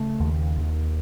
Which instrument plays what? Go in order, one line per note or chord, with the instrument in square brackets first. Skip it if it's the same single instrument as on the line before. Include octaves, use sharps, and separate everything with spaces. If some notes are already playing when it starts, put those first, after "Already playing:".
Already playing: [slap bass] C#3 A3
D#2
D#2